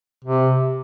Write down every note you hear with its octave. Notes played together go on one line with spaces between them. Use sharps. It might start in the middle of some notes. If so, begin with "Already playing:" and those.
C3